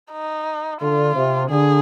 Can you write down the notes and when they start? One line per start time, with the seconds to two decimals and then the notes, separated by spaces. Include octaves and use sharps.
0.12 D#4
0.81 D3 F4
1.15 C3
1.50 D3 G#4